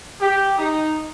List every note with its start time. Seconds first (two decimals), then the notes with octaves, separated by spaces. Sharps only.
0.21 G4
0.58 D#4